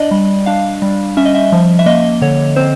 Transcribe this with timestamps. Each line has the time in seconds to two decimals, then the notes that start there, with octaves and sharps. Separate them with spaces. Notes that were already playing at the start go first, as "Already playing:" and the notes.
Already playing: D4 D5 D#5
0.11 G3
0.46 D4 F5
0.82 G3
1.17 C#4 E5
1.25 D#5
1.35 E5
1.52 F3
1.79 E5
1.86 A#3 D#5
2.22 D3 C#5
2.56 C4 C5